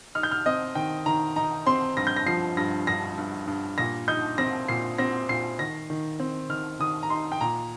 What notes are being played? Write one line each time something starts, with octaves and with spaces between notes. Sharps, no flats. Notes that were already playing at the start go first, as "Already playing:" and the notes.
D#4 F6
G6
F6
C4 D#5
D#3 G5
D#3 A#5
D#4 A#5
C4 C6
G2 A#6
G6
A#6
F3 C7
G2 A#6
G2 A#6
G2
G2
A#2 A#6
D#4 G6
C4 A#6
A#2 C7
C4 A#6
A#2 C7
D#3 A#6
D#3
C4
D#3 F6
D#3 D#6
A#5
D#4 C6
G5
A#2 A#5